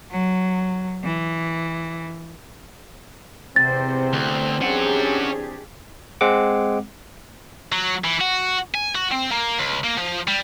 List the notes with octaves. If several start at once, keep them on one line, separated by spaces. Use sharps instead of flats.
F#3
E3
E2 C3 C4 C5 A6
D2
C#4 D4 G4 G#4 F#5
G#3 C4 F#5 D6
F#3
E3
F#4
G#5
F#4
C4
A#3
C#2
A#3
F3
G3